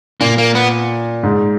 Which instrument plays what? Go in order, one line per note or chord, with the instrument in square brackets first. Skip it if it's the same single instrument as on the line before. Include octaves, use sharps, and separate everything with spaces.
[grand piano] A#2 [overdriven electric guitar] A#3
[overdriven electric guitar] A#3
B3
[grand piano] G#2